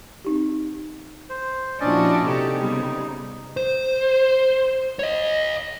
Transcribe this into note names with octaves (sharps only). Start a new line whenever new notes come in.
C4 D#4 G4
C5
A#2 F3 C#4 D4 E4 F#4 D5 D#5
C3 D#4 G4 A4
C#3 G3 B3
C5
C#5 D#5